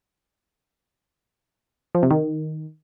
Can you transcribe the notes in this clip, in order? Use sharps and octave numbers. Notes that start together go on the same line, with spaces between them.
F3
C3
D#3